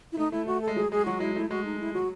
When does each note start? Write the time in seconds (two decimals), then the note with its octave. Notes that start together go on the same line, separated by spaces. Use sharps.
0.12 E4
0.17 A3 D#4
0.32 A3 E4
0.47 A3 F#4
0.62 A4
0.67 G#3
0.76 F#3 G#4
0.92 G#3 G#4
1.06 F#3 F#4
1.20 G#3 E4
1.35 A3 E4
1.50 G#3 F#4
1.65 D#4
1.80 E4
1.94 F#3 F#4